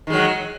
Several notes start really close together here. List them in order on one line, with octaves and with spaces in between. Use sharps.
D#3 G#3 F#3